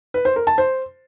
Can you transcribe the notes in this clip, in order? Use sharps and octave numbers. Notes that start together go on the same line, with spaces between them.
B4
C5
A#4
A5
C5